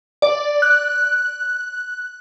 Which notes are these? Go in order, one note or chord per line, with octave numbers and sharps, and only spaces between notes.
D5
F#6